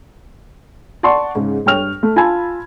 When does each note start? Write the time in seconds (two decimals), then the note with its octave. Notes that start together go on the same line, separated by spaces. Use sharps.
1.03 D5 F#5 A5 C6 C#6
1.35 G#2 C#3
1.66 G2 C#5 G5 C#6 F6 F7
2.03 A3
2.16 F4 G#5 A5 B5 E6 G#6